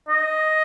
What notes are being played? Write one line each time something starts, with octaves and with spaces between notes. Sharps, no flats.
D#5